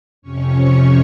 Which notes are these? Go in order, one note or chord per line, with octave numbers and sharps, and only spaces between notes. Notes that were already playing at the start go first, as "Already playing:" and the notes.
F2 C3 C#4 C#5